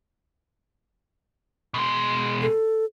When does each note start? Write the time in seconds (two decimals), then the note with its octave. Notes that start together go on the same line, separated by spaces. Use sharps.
1.74 B2 G#3
2.42 A4